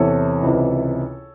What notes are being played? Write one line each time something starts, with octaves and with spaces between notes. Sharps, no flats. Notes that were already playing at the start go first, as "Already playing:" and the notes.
Already playing: E2 C3 E3 A4 C#5
C#2 C3 E3